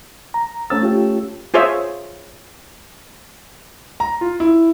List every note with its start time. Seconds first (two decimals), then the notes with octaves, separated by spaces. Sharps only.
0.34 A#5
0.70 A3 C#4 E6 A6
0.83 F4 G4
1.54 F4 G#4 C5 C#5 E5
4.00 A#5
4.21 F4
4.40 E4